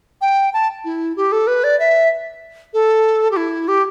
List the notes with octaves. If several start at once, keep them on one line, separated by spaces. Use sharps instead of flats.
G5
A5
E4
G4
A4
B4
D5
E5
A4
G4
E4
G4